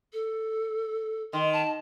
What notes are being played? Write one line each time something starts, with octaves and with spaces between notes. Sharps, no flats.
A4
D#3 C6
A5